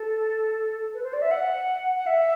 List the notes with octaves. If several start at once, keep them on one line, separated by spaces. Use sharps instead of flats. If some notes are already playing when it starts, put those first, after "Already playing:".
Already playing: A4
B4
C5
D5
E5
F#5
F#5
E5